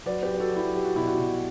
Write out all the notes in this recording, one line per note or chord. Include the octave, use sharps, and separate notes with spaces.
F#3 B4 D5
G4 B4
F#3
B4
F#4 A4
F#3
E4 G4
F#3 G4
F#4
B2 E4
F#4
B2